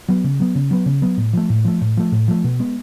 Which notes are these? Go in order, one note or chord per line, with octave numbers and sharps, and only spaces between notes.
F#3 B3
C#3
F#3 B3
C#3
F#3 B3
C#3
F#3 B3
A2
F3 A3
A2
F3 A3
A2
F3 A3
A2
F3 A3
B2
G#3 B3